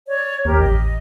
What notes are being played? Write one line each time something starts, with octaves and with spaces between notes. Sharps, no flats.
C#5 D5
D#2 G4 A#4
A1 D#5